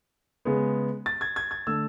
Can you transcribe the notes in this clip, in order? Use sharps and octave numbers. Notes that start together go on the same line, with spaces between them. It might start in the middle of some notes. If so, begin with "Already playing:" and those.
C#3 G#3 B3
A6
G#6
G#6
G#6
D3 A3 E6